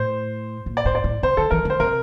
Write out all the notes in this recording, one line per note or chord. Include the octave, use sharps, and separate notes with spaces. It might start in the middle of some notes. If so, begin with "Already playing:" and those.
Already playing: A2 C5
A#2
D5
A2 C5
D5
A2
C3 C5
D3 A4
E3 A#4
D3 C5
C3 A#4